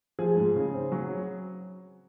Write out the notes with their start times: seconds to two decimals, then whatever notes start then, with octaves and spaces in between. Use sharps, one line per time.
0.19 F3 G#4
0.36 G#2
0.56 C#3
0.74 C4
0.92 F#3